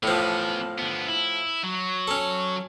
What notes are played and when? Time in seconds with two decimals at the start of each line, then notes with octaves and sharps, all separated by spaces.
0.03 A2 E3 F3 B3
0.79 D3 B3
1.08 E4
1.63 F#3
2.08 C#4 A4